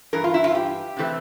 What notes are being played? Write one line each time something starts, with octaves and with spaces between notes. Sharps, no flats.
G2 E3 A#4
F4
E4
F4
G4
C3 E3 A3 C4